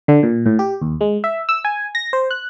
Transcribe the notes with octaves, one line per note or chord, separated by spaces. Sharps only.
D3
A#2
A2
G4
D#2
G#3
E5
E6
G#5
A#6
C5
F#6